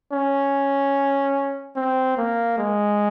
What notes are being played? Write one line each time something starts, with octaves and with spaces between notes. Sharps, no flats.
C#4
C4
A#3
G#3